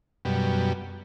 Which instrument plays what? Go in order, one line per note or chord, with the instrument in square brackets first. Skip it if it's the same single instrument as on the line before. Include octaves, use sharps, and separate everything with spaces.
[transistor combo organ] F#2 B2 G3